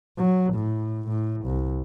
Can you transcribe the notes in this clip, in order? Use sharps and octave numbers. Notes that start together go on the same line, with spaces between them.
F#3
A2
A2
C2